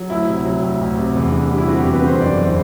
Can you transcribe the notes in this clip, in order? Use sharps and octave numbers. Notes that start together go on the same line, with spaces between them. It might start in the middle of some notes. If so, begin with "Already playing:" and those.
Already playing: F#3
D2 E4
C3
F#3
D2
D2
C3
E2
D3
G3
E4
C4 F#4
E2 G4
B4
D3 C5
F#1 D5
E2
C5